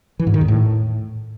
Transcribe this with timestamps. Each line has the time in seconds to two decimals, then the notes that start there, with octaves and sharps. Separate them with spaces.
0.19 E3
0.27 G#2
0.34 D#3
0.41 E2
0.48 A2